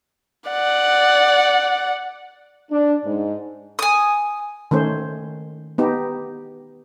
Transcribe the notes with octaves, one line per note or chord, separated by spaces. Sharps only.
D5 F#5
D4
G#2
G#5 D#6
D#3 A3 C#4 C5
B3 D#4 G4